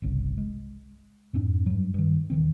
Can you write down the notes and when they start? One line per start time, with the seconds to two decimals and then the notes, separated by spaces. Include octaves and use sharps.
0.02 G1 C2 C#3
0.38 G#3
1.33 F2 G#2 C4 D4
1.66 G2 F#3
1.94 G2 D#3
2.30 D#1 D#3 E3 C4